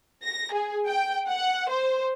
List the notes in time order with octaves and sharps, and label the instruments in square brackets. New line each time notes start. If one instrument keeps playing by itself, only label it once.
[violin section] A#6
G#4
G5
F#5
C5